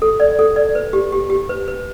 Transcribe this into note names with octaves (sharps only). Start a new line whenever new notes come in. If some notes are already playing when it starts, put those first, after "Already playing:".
A4
D5
A4
D5
B4
G4
G4
G4
B4
B4